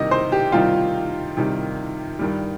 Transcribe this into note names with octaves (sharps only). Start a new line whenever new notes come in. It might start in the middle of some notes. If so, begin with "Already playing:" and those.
Already playing: C3 D#3 G3 D#4 D#5
C5
G4
C3 D#3 G3 D#4 F4
C3 D#3 G3 D#4
G2 D#3 G3